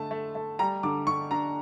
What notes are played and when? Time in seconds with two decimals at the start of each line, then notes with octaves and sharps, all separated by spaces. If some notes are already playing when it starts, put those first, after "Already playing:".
Already playing: D3 A3 A5
0.11 A3
0.35 A3
0.59 G3 A#5
0.83 D3 D6
1.07 D3 C#6
1.31 D4 A#5